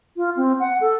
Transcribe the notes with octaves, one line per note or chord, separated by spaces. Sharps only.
F4
C4
F#5
A4